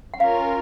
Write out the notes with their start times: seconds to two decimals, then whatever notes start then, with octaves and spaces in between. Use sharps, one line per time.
0.14 F#5
0.20 C#4 F4 A#4 F5